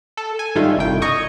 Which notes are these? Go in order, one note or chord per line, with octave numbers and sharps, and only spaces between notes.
A4
G#5
G#2 D#3 G3 A3 F4
G1 C2 G5
D#5 G#5 A#5 C#6 D#6